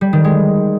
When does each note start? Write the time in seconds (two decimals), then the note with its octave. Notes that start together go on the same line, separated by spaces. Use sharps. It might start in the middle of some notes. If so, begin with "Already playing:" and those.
0.01 G3
0.13 D#3
0.24 G#3